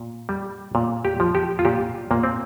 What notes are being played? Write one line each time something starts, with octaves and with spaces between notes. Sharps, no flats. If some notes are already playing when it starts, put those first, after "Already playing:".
Already playing: A#2
G3
A#2
G4
F3
G4
F4
A#2 G4
A#2 A#3
C4